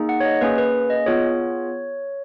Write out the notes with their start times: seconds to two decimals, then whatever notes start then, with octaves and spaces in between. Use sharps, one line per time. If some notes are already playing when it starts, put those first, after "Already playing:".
Already playing: A#3 D#4 G#4
0.09 F#5
0.20 C#5
0.25 D#5
0.41 A#3 C#4 G#4 B4
0.58 B4
0.90 D#5
1.06 B3 F4 G#4 C#5